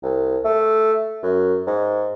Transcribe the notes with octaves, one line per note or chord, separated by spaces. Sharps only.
C2
A3
F#2
G#2